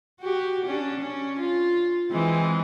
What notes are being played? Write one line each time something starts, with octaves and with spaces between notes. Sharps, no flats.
F#4 G4
C#4 D4
C#4
F4
E3 G#3 C4